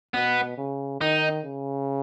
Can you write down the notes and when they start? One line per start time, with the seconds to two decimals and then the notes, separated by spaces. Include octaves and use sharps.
0.14 B2 B3
0.58 C#3
1.01 D#3 D#4
1.45 C#3